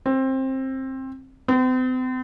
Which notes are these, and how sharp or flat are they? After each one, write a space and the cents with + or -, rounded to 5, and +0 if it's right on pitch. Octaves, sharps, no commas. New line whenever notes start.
C4 +20
C4 -40